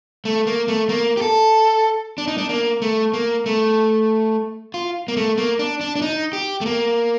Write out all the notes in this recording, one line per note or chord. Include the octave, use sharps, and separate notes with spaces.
A3
A#3
A3
A#3
G4
A4
D4
D#4
D4
A#3
A3
A#3
A3
F4
A#3
A3
A#3
D4
D4
D4
D#4
G4
A3
A#3